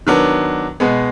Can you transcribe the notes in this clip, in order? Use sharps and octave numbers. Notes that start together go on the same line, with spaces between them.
D#3 F#3 B3 D4
B2 G#3 B3